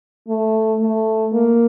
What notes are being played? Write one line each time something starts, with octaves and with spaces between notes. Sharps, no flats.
A3
A3
A#3